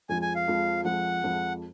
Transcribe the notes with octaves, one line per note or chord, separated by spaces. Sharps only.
F2 F3 G#3 G#5
G#5
F5
F2 F3 G#3
F2 F3 G#3 F#5
F2 F3 G#3